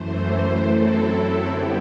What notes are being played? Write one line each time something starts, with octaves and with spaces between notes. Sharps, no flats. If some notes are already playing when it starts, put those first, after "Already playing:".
Already playing: F#2 E3 A3 C5
C5
F#2 F#3 C4 E4 A4
D3 G3 B3 E4 G4